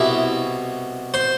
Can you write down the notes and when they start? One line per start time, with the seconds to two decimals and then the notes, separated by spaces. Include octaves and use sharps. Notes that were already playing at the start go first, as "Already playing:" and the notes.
Already playing: C2 B2 E4
1.14 C5